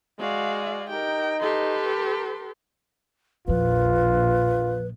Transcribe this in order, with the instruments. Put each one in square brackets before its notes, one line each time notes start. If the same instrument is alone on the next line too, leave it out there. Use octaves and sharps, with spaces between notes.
[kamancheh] G#3 D5 [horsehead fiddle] F#4 F5
[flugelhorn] D#4 [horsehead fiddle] G4 A#4 [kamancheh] G5
[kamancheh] G4 C6 [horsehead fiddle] A4 B4
[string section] A#1 [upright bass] E2 F3 [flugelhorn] F4 [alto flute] B4